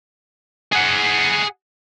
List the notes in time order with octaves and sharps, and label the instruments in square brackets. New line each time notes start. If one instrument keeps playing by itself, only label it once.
[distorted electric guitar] G#4 F#5